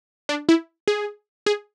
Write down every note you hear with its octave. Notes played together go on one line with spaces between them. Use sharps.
D4
E4
G#4
G#4